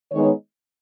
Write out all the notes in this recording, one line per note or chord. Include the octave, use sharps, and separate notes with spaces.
D#3 G#3 B3 D#4 C#5